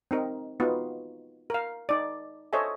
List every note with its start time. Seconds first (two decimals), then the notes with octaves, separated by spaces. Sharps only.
0.11 C4 D#4 A#4
0.60 B3 D#4 F4 F#4
1.50 A#4 F5
1.89 D#4 D5
2.53 A4 C5 C#5 D#5 E5 G#5